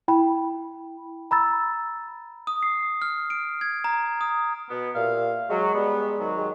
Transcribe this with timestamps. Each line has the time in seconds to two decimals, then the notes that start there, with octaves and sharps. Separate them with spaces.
0.08 E4 G5 B5
1.31 A#5 B5 E6 A6
2.47 D#6
2.63 C7
3.02 F6
3.30 D7
3.61 G#6
3.84 A#5
4.21 D#6
4.70 B2 B3
4.96 A#2 G4 E5 F5
5.50 F#3 G#3
5.74 G3 B3
6.19 G#2 D#3 F#3
6.37 G#3